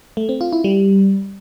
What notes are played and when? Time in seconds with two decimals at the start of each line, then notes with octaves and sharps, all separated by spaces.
0.17 A3
0.29 C4
0.41 F4
0.53 E4
0.64 G3